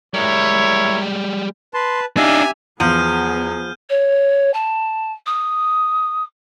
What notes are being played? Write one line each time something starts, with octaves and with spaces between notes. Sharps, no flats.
G3 G#3 E4 A#4 C#5
B4 A5 C6
D4 D#4 G4 E5 F5 G#5 E6
E2 F3 B3 G#4 F6 G6 D#7
C#5
A5
D#6